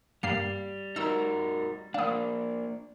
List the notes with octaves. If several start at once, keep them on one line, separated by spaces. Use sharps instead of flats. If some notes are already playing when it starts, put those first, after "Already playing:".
G2 G3 A#3 C7
D#4 F#4 A#4 E6
A#3 D4 F5 D#6